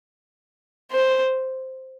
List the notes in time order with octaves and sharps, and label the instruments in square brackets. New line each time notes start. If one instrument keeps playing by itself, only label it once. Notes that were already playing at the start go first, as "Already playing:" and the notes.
[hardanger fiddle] C5